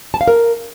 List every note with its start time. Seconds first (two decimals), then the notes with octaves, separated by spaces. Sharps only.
0.14 A5
0.21 F5
0.28 A#4